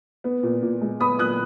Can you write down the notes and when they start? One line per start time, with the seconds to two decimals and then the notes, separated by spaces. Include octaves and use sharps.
0.24 B3
0.43 A#2
0.62 A#2
0.81 G#3
1.00 B3 B5 D#6
1.19 A#2 D#6 F#6